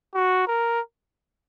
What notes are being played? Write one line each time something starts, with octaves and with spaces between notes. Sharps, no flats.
F#4
A#4